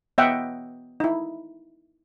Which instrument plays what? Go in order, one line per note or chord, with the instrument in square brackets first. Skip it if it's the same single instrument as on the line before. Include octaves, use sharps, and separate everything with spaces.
[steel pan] B3 D#5 E5 F#5 G5
D#4 E4